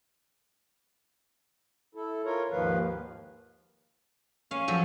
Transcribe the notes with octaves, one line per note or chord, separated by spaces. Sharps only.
E4 A4
F4 A#4 C#5
D#2 G#2 D#3 F3 B4 F5
C#4 F5
F3 F#3 A4